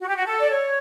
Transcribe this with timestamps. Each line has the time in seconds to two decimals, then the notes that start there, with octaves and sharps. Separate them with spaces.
0.01 F#4
0.08 G4
0.16 F#4
0.26 A4
0.40 D5
0.50 C#5